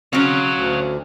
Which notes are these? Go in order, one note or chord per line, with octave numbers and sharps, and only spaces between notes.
F#3 C4 C#4 C#5 F5
D2